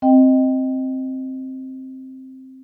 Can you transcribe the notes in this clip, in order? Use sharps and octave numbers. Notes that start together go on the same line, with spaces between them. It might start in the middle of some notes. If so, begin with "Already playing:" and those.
C4 D#5 G5